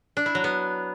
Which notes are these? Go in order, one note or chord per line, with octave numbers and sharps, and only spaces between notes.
D4
E4
F#3
B3